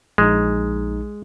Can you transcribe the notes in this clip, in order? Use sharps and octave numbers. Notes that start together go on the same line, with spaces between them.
A#1 G#3 D#4